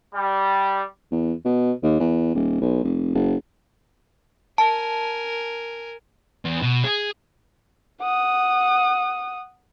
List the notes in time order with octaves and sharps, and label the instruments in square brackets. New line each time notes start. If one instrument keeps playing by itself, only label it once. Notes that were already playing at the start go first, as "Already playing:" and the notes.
[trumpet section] G3
[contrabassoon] E2
B2
D#2
E2
D#1
B1
F1
F#1
[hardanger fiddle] A#4 G#5 [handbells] A5
[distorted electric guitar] E2
B2
G#4
[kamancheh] F#5 D#6